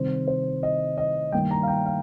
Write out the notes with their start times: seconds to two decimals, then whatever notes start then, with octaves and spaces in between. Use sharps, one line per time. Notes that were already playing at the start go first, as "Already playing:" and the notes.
Already playing: C3 D#3 G3 C4 C5
0.28 C5
0.63 D#5
0.98 D#5
1.32 G2 D#3 A#3 G5
1.51 A#5
1.63 F5
1.68 G5
1.86 F5